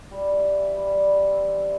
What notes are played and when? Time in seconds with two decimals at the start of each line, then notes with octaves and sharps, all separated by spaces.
0.11 G3
0.31 E3
0.51 C4
0.72 G3
0.92 G3
1.11 C3
1.32 C4
1.51 E3